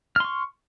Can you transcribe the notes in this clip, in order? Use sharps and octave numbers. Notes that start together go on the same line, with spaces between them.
C6 C#6 F6